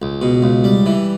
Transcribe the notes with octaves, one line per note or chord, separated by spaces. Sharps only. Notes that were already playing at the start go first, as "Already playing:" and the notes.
C#2
B2
C#2
G3
E3